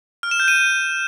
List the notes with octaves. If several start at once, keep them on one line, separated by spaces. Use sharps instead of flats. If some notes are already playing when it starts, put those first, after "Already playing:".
F6
E7
G6
D#7